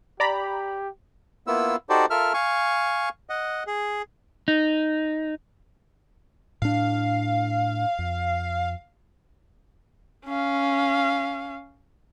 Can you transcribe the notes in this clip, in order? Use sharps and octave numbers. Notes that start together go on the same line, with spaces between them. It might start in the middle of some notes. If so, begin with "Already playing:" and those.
G4 D5 A#5 B5
A#3 B3 E4 F4 E6
D#4 F#4 G4 A4 C5 D5
F4 A4 A#4 E5 F6
F5 G#5 C#6
D#5 F#5
G#4
D#4
A2 D4 F5
F2
C#4 F5